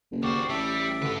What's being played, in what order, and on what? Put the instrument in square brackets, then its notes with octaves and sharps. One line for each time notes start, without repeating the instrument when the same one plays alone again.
[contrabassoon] F#1
[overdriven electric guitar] D#2 C5 [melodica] F#4 G4 D5
[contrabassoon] A1 [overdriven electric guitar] G3 [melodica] E5 A5 D6
[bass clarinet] D3 [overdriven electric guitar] G4 B4